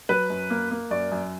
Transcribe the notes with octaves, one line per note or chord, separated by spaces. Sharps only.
F#3 B4
F#2
A#3
A#3
F#2 D5
F#2